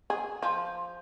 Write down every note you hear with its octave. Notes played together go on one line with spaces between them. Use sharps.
G#4
F3